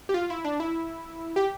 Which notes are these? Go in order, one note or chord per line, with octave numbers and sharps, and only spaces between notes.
G4
F4
E4
D4
E4
G4